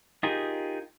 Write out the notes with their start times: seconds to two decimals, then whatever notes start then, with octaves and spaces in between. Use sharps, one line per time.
0.23 D#4 F4 G4 G#4 A#4